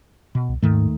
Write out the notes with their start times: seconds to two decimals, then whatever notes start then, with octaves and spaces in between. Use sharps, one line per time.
0.35 B2
0.49 C2
0.62 D#2 G#2 D#3 A3